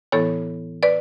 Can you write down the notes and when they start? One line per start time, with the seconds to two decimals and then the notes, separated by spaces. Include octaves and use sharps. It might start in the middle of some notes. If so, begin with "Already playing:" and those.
0.12 A2 E3 B3 E4 A4 C#5
0.83 B4 D5